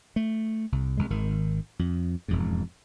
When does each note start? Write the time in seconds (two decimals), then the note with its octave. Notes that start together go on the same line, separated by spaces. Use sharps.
0.16 A3
0.72 C2
0.97 C2 G#3
1.10 G#1 D#3
1.79 F2
2.28 E1 F2 G#2